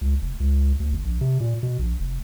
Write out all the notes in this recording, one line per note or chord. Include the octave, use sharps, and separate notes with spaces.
C#2
F1
C#2
D2
G1
A#1
C3
A#2
B2
A#1
F1